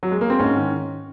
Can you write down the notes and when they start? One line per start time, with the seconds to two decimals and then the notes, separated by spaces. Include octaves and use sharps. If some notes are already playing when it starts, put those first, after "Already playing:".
0.03 F#3
0.11 G#3
0.21 A#3
0.30 C4
0.39 G#2 C#4
0.56 D#3